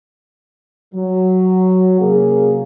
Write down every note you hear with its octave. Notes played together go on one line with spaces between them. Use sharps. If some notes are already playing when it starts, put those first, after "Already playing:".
F#3
C3 A#3 C#4 G#4